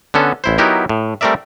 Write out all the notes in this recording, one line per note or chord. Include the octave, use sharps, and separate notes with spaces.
D3 B3 C#4 A4
A1 E4 C5
F#3 B3 D#4 E4 G4 A#4
A2
G3 A3 C4 A#4 D5 E5